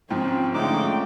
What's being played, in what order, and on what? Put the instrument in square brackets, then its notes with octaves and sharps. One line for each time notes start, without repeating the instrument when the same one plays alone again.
[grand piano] G#2 F3 G5 [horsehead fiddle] C4 C#4
[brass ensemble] G#2 F3 C#4 [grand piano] D3 [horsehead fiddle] A3 G5 [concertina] D#4 D6